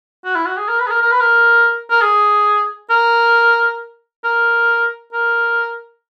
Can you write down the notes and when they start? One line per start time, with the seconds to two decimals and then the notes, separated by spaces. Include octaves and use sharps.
0.25 F#4
0.35 E4
0.46 F#4
0.57 G#4
0.68 A#4
0.80 B4
0.86 G#4
0.91 A#4
1.02 A#4
1.11 B4
1.20 A#4
1.90 A#4
2.01 G#4
2.90 A#4
4.24 A#4
5.13 A#4